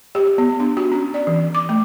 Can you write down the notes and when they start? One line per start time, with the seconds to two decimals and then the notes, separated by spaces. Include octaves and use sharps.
0.15 G4
0.38 B3
0.60 D4
0.77 F#4
0.92 C#4
1.14 D5
1.27 E3
1.55 D6
1.69 A3